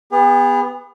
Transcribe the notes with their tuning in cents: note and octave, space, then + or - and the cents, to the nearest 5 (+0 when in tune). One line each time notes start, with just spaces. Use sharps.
B3 +0 G#4 -45